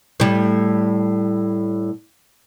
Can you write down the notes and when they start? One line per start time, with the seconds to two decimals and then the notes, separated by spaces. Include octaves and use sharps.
0.20 A2 G3